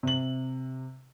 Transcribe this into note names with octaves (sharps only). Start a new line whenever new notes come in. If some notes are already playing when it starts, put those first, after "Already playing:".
C3 F#7